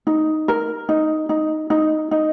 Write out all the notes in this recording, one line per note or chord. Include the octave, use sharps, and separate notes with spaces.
D#4
A#4
D#4
D#4
D#4
D#4